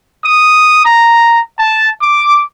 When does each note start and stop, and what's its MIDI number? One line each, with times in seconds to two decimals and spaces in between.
0.24 0.82 87
0.85 1.41 82
1.59 1.90 81
2.02 2.42 86